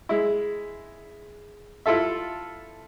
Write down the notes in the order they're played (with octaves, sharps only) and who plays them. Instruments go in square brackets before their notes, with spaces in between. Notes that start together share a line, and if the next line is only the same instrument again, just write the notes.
[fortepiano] G#3 E4
E4 F4 A4 E5